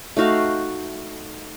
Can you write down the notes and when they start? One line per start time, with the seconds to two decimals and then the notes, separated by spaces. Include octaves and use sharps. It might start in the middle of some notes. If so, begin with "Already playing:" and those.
0.16 A3 D#4 F#4 F5